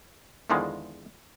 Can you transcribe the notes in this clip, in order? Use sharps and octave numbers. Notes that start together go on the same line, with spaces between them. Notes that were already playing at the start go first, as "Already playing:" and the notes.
E2 D3 D#3 F3 G#3